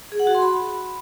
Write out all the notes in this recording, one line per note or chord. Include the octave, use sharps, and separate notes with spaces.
G#4
F#5
F#4
C6
B5